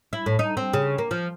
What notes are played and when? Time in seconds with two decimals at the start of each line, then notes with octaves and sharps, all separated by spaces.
0.13 E4
0.26 A2
0.39 D#4
0.57 C4
0.73 C#3
0.98 A#3
1.11 F3